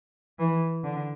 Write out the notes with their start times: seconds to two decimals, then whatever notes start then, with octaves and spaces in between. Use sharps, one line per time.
0.39 E3
0.84 D3